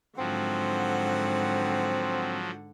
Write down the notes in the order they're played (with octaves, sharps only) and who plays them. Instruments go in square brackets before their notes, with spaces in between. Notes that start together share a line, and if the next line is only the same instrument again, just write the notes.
[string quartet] G#2 D3 F#5 [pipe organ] F3 F#3 [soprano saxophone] C4